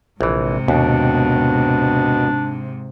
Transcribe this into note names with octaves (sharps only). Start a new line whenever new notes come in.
A#1 G#2 C3 E3
D#2 B2 D4